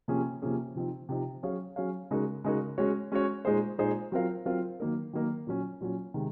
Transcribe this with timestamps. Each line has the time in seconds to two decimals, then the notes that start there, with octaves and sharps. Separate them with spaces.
0.08 C3 F3 A#3 C#4 G#4
0.42 C3 F3 A#3 C#4 G#4
0.75 C3 F3 C4 D#4
1.09 C3 F3 C4 D#4
1.43 F#3 C#4 G#4 C#5 F5
1.76 F#3 C#4 G#4 C#5 F5
2.11 C#3 G#3 D#4 F#4 A#4
2.44 C#3 G#3 D#4 F#4 A#4
2.78 G#3 C#4 F#4 C#5
3.12 G#3 C#4 F#4 C#5
3.45 A#2 G#3 D#4 G#4 C5
3.78 A#2 G#3 D#4 G#4 C5
4.12 F#3 C4 F4 A#4 F5
4.45 F#3 C4 F4 A#4 F5
4.80 D#3 F#3 A#3 D#4 A#4
5.13 D#3 F#3 A#3 D#4 A#4
5.47 A#2 F#3 C#4
5.81 A#2 F#3 C#4
6.14 C3 D#3 G#3